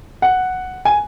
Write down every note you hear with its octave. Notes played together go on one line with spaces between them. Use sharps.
F#5
G#5